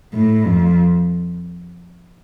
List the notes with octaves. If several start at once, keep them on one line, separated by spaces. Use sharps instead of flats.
A2
F2